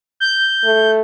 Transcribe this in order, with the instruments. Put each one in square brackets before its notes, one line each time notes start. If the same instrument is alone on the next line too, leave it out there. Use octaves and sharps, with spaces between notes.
[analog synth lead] G6
[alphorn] A3